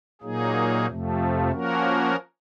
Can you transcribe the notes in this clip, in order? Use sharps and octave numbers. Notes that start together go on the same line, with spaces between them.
A#2 F#3 A#3 D#4 G#4
F2 C3 F3 A3
F3 A#3 C#4 F#4 A#4